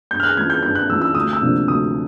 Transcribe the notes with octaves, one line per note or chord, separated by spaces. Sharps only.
G2 G6
F6
F#6
E3 G#3 C#4 F4 G#6
G6
G2 G6
F#6
E3 G#3 C#4 F4 E6
E6
D2 D#6
E6
C3 F3 A#3 D4
D2 D#6